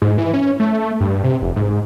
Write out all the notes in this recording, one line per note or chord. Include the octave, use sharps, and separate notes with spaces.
G#2
E3
C#4
A3
G2
C3
F1
G#2